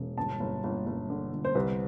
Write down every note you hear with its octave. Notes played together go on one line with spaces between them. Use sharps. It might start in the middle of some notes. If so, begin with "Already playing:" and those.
Already playing: E1
G1 A5
G1
G1
G1
D3
G1
C5
C2 B4